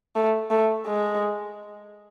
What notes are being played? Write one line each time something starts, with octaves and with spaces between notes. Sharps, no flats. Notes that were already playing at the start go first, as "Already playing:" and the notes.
A3
A3
G#3